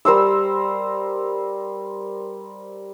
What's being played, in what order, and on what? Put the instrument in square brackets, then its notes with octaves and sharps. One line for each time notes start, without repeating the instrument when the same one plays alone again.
[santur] G3 A#4 C5 E6